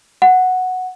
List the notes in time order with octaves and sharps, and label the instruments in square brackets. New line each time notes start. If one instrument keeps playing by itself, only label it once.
[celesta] F#5